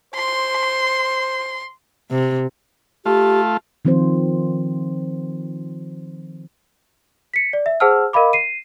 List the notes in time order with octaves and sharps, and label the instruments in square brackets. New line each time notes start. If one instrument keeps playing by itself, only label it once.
[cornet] C5 [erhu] C6
[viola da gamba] C3
[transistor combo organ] A3 F4 [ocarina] G4
[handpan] D#3 F3 C4 F4 C5
[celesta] B6 C#7
D5
E5
G#4 C5 F#5 A5 E6 F6
A#4 D#5 F5 B5 D6
C7 D#7